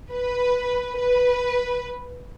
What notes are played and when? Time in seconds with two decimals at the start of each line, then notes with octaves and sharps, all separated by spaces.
0.12 B4
0.98 B4